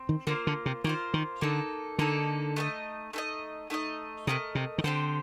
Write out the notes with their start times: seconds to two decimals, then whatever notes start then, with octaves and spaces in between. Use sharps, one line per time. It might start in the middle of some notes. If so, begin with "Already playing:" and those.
Already playing: C4
0.09 D#3
0.27 D3 A#3 F4 C5
0.47 D3
0.66 C3
0.84 D#3 A#3 F4 C5
1.14 D#3
1.41 D3 A#3 D#4 A4
1.98 D3 A#3 D#4 A4
2.56 A3 D#4 A4 D#5
3.13 A3 D#4 A4 D#5
3.70 A3 D#4 A#4 D#5
4.27 C3 A3 D#4 A#4 D#5
4.55 C3
4.78 D#3
4.84 D3 C4 G4 C5 G5